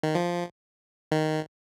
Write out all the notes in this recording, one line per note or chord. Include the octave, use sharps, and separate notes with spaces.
D#3
F3
D#3